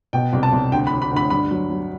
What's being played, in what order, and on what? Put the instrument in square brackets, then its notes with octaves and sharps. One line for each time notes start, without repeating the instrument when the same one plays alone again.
[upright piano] B2 G5
C2
A5
C2
D2 G5
B5
D2
B5
D2
B5
G2 B5
F#3
F#3